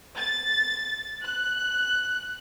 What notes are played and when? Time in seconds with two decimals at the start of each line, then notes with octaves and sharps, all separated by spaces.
0.15 A6
1.23 F#6